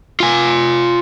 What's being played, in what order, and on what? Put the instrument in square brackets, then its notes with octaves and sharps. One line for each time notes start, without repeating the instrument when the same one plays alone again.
[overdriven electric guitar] F4 G#5